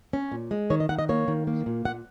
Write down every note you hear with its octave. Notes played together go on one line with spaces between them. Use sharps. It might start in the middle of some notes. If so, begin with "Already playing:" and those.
C#4
A#2
G#3
D#3 C#5
D#5
D#3 F#5
D#5
A#3 C#5
D#3
A#3
A#2
A#2 F#5